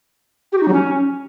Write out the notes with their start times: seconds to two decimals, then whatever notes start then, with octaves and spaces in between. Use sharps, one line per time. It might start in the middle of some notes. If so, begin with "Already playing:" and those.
0.52 G4
0.58 F#4
0.63 D#4
0.68 F#3
0.73 C#4